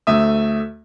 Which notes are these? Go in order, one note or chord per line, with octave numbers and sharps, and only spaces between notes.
D2 A3 E5 D#6